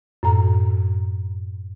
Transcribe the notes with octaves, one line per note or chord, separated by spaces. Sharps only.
F#2 A2 A#5